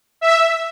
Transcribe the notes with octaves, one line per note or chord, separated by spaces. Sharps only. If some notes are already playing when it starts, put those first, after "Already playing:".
E5